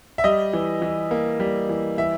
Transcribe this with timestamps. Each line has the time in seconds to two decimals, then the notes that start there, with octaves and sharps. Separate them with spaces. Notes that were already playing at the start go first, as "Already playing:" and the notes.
0.18 E5
0.24 G3 D#5
0.53 E3
0.82 E3
1.11 A#3
1.40 G3
1.69 E3
1.98 E3 E5